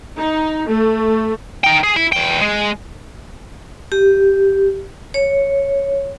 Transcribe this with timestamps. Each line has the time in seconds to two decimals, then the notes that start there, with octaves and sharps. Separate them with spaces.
0.20 D#4
0.70 A3
1.64 D#4 G5
1.83 G#4
1.96 E4
2.12 E2 G5
2.41 G#3
3.92 G4
5.14 C#5